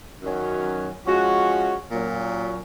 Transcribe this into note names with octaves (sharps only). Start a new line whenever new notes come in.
F#2 D#3 F#3 C#4
F3 G#3 C#4 F#4
A#2 F#3 C#4